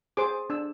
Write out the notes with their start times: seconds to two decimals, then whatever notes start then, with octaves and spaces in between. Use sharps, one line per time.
0.17 G#4 C5 D6
0.50 D4 E6